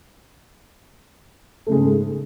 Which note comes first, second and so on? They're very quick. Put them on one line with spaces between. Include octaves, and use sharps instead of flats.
A3 C#3 G#3 G#2